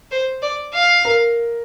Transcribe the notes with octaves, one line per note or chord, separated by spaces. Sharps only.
C5
D5
F5
A#4